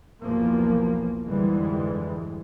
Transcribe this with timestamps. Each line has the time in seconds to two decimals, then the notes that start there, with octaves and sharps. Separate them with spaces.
0.22 B1 E2 F3 A#3
1.27 F2 G#2 D3 E3 G3 G#3